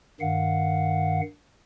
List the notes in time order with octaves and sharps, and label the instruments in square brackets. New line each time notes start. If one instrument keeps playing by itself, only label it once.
[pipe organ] G2 D#3 F5 F#5